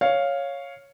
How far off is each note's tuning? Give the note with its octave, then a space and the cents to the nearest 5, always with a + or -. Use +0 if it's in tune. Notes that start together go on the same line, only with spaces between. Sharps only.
C#5 +0 F5 +0